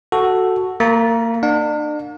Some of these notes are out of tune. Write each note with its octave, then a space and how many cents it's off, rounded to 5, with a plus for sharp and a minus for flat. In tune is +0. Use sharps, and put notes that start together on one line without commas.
F#4 +0 A4 +0
A#3 -30 A#5 +20
D4 +40 F5 +45